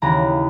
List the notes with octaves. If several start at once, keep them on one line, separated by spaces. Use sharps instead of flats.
D#2 C#3 E3 A#5